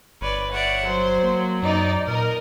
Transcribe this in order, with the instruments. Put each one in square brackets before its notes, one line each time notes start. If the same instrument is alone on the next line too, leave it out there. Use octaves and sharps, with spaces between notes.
[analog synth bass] G1 [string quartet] B4 C#5 D5
[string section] C#5 [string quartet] D5 E5 F#5
[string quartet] F#3 [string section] C5
[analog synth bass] A#3
[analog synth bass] F#2 [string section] D#4 D5
[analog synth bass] A#2 [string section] A#4 D#5